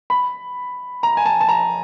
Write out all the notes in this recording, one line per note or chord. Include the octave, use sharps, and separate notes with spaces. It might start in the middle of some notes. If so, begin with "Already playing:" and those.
B5
A#5
G#5
A5
A5
A#5